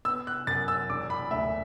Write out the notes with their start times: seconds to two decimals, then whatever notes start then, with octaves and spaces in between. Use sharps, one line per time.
0.05 B3 E6
0.27 F#6
0.47 F#2 A6
0.68 E6
0.89 E1 D6
1.10 B5
1.31 D2 E5